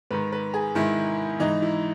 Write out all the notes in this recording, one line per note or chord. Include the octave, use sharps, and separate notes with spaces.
G#2 D#3 B4
B4
G#4
G#2 D#3 E4
G#2 E3 D#4
E4